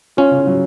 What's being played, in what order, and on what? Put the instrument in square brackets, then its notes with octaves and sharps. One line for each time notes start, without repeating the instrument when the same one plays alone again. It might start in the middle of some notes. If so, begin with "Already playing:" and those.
[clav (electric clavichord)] C#4 [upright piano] F4
[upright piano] C#3
F#3